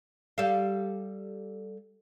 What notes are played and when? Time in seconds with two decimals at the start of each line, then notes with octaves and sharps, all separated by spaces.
0.38 G3 A4 F5